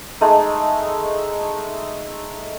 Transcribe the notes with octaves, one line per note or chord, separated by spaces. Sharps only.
G#3 A3 D#4